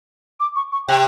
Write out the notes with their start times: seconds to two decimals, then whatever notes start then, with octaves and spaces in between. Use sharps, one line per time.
0.40 D6
0.56 C#6
0.72 C#6
0.88 C3 G5